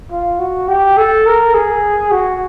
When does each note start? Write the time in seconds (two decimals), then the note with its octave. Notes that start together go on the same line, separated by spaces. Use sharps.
0.11 F4
0.39 F#4
0.68 G4
0.97 A4
1.26 A#4
1.54 G#4
2.11 F#4